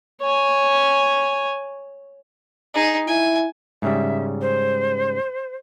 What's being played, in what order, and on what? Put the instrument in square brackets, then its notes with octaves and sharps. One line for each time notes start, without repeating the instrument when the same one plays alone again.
[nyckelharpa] C#5 G#5
[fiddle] D#4 G#4
[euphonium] E4 [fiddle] G#5
[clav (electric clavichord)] G#2 C#3 G3 [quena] E5
[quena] C5